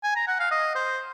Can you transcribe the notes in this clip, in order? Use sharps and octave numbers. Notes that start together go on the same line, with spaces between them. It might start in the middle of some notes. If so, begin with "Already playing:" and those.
G#5
A#5
F#5
F5
D#5
C5